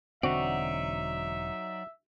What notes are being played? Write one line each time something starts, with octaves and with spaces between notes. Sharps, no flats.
E1 D3 F#3 C4 D#4 F#4 D5 E5